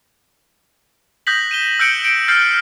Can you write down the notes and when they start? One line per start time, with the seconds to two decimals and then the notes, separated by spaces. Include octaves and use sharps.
1.27 D#6 F#6 G6 A#6 B6 F#7
1.51 D#7 E7 G7
1.79 E6 F#6 G6 C#7 D7 F#7
2.04 C#7 D7
2.28 F6 G6 A6 C7